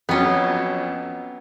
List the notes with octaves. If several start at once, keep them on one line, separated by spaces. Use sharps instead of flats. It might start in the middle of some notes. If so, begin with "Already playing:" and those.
F2 F#3 B3 C#4